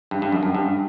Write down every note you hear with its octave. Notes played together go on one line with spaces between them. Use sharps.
G2
G2
F#2
F#2
G2